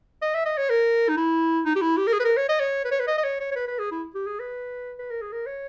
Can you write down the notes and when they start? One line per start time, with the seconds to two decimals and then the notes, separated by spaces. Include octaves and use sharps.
0.22 D#5
0.34 E5
0.45 D#5
0.57 C#5
0.70 A#4
1.09 D#4
1.17 E4
1.65 D#4
1.76 G4
1.81 E4
1.97 G4
2.07 A#4
2.13 G#4
2.20 B4
2.24 A#4
2.37 C#5
2.49 D#5
2.60 C#5
2.84 B4
2.91 C#5
2.99 B4
3.08 D#5
3.18 D#5
3.24 C#5
3.40 C#5
3.51 C#5
3.55 B4
3.68 B4
3.79 G#4
3.91 E4
4.15 G4
4.27 G#4
4.40 B4
4.99 B4
5.10 A#4
5.21 G#4
5.32 A#4
5.46 C#5